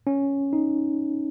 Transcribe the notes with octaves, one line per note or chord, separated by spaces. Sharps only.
C#4
D#4